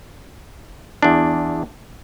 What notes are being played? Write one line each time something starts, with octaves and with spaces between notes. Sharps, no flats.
E2 D4